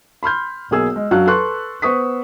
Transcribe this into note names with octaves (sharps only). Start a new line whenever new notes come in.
B5 C6 F6 G6
B1 A#3 G#4 E6
G#3
F#2 F#3 D4 F5 F#6
A4 B4 C6 C#6 F#6
B3 C5 C#6 D#6 B6